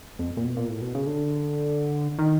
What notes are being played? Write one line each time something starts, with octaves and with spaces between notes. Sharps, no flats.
F2
A#2
B2
A#2
A2
B2
C#3
D3
D#3